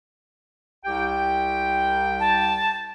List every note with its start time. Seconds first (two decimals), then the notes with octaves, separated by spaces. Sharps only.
0.84 C2 G4 G5
2.20 A5